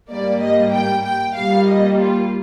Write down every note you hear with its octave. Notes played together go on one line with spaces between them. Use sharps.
G#2 G3 A#3 D5
D#5
G5
G5
A#2 G3 A#3 F5
D#5
F4